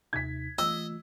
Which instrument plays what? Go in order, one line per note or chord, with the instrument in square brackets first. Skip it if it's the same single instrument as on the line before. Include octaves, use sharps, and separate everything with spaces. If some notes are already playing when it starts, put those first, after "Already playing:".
[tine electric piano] D#2 C3 D#4 [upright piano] G#6 B6
[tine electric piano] E3 A3 F4 [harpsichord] D#5 [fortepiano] E6